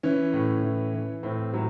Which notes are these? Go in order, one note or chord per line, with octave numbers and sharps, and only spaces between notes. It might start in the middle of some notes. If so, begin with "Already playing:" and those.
E3 C#4
A2
E3
E3
A2 C4
A2 F#3